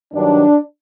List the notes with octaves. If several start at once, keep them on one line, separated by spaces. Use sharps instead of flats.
G2 D#3 F#3 D4